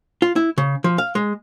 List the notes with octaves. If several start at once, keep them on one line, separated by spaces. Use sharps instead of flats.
F4
E4
C#3
F3
F5
G#3